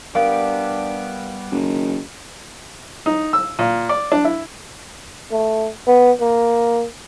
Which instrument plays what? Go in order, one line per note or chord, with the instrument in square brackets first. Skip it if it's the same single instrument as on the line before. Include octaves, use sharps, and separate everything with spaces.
[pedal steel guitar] G3 B3 G4 [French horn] D4 [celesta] A#4 F5 D7
[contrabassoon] F#1 [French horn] D#3
[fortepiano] D#4
E6
A#2
D5
D4
E4
[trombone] A3
B3
A#3